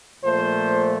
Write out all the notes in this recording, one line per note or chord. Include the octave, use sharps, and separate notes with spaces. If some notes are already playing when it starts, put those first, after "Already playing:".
A#2 F3 A3 C5